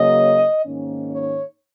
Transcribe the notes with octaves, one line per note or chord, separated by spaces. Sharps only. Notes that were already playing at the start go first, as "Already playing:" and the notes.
Already playing: C#3 F#3 A#3 C#4 D#5
G#2 D#3 A#3 C#4
C#5